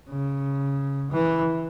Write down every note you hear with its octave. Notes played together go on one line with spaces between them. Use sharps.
C#3
E3